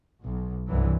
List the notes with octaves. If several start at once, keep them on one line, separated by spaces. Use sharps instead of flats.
B1
C2 G2 E3 F#3